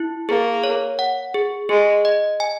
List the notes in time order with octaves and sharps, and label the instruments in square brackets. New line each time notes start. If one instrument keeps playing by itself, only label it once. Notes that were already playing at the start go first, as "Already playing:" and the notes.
Already playing: [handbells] E4
[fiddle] A#3 [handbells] G#4
[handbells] C#5
F#5
G#4
[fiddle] G#3 [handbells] G#4
[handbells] D#5
G#5